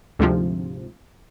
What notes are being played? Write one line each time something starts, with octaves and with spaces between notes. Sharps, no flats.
D2 G#2 C3 F3